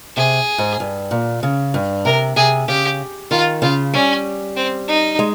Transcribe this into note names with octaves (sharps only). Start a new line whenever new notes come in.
C3 G#4
G#2
G2
A#2
C#3
G2
C3 A#4
C3 G#4
C#3 G4
D#3 F4
C#3 F4
G3 C#4
C4
D#4
G#3